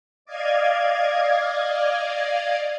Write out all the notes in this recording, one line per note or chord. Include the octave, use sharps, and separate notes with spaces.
D5 D#5 F5 G#6